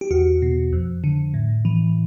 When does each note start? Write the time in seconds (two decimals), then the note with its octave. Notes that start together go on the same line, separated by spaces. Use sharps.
0.01 G4
0.11 E2 F#4
0.42 B2
0.73 F2
1.04 D3
1.34 A2
1.65 E3